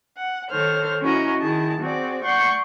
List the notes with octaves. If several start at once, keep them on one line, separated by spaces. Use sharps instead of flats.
F#5
D#3 A4 C5 C#5 F6
C#4 E4 F#4 D#5 A#5
D#3 E4 G#4 A5
C4 F#4 G#4 D5
D5 F#5 C6 C#6 G6